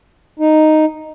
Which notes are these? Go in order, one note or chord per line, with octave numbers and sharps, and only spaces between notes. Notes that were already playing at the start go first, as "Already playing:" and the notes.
D#4